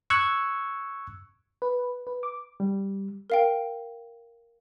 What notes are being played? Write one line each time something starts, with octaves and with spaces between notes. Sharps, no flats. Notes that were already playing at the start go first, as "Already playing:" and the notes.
C#6 E6 F#6 G#6
B4
B4
D6
G3
A#4 F5 G5